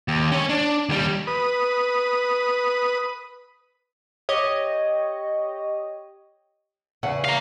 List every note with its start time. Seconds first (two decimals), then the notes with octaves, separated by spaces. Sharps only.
0.08 D#2
0.32 C#4 C#5
0.49 D4
0.89 D#2 G3
1.27 B4 D#6
4.29 G4 C#5 D#5
7.03 E2 C#3 F#5
7.25 F5 A#5